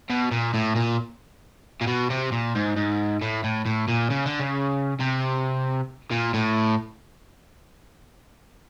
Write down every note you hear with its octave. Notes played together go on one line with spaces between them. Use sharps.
B2
A#2
A2
A#2
A#2
B2
C3
A#2
G#2
G#2
A2
A2
A2
A#2
C#3
D3
C#3
C3
A#2
A2